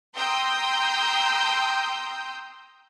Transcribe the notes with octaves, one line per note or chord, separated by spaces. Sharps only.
G5 A#5 C6 D#6 E6 G6